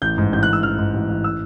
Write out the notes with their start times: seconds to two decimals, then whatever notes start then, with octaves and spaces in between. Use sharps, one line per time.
0.02 A1 G6
0.18 G#2
0.33 A1 G6
0.43 F#6
0.48 A1
0.53 E6
0.63 A1 F6
0.78 G#2
0.94 A1
1.09 A1
1.24 E6